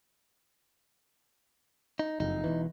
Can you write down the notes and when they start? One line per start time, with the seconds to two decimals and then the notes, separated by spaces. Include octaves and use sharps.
1.99 D#4
2.20 F#1 F2 D#4
2.44 E1 E2 E3